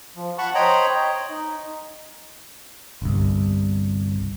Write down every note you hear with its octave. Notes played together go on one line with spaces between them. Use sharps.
F3
F#5 A5 B5 C#6
C5 C#5 D#5 G5 A#5 B5
D#5
D#4
G1 C2